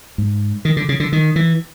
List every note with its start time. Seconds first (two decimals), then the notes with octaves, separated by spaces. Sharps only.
0.18 G#2
0.65 D#3
0.77 D3
0.89 C#3
1.00 D3
1.12 D#3
1.36 E3